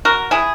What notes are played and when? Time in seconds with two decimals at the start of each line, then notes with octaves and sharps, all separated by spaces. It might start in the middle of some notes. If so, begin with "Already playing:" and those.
0.05 F#4 A#4
0.31 E4 G#4